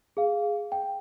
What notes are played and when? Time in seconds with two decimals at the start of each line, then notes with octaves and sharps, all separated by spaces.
0.17 G#4 F5
0.72 G5